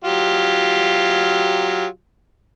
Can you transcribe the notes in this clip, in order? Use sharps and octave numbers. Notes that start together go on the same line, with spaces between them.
F#3 F4 G4